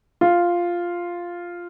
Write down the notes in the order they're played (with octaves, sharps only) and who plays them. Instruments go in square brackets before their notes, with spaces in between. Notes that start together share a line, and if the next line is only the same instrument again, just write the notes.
[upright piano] F4